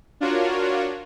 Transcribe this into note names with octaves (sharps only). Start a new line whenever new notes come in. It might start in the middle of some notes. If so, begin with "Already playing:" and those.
D4 F4 F#4 A#4 C#5